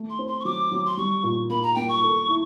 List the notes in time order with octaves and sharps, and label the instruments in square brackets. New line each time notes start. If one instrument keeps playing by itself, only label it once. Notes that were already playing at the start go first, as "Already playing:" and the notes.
Already playing: [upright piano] A3
[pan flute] C6
[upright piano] C4
[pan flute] C6
C#6
[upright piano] F#3 [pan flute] D6
[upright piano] F#3
[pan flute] C6
[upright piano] G3 [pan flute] C#6
[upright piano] A#2
[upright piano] A#3 [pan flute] B5
[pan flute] A#5
[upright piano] A#3 [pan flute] G5
[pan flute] C#6
[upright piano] A4
E4